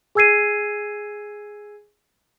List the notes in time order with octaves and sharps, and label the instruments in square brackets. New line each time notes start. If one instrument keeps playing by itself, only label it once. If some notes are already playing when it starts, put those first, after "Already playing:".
[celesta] G#4 G#5 E6 G#6 C7 D#7